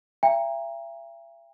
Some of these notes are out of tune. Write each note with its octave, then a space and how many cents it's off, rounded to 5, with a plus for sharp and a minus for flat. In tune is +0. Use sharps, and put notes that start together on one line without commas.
E5 +40 G5 +40 A#5 +5